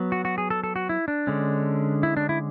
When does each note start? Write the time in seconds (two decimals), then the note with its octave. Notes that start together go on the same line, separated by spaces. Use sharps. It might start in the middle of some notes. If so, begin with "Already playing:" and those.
Already playing: F#3 B3
0.12 F#4
0.25 F#4
0.38 G#4
0.50 A4
0.64 A4
0.76 F#4
0.89 E4
1.08 D4
1.27 D3 G#3 C#4
2.03 E4
2.17 D4
2.29 E4